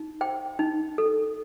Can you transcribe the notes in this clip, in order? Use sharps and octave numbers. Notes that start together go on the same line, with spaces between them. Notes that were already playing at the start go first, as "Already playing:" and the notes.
Already playing: D#4
C5 G5
D#4
A4